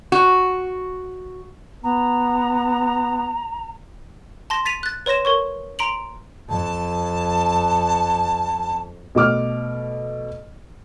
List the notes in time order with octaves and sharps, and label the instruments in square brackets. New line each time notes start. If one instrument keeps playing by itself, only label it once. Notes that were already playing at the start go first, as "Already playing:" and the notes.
[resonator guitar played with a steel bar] F#4
[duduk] B3 [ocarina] A#5
[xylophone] A5 C6 A#6
A6 B6 D#7 F7
F#6 A6
B4 C#5 C6 A#6 E7
A#4 C#5 C#6
A#5 C6 D7 F7 F#7
[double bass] F2 [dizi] A5
[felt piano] B2 A3 D6 F6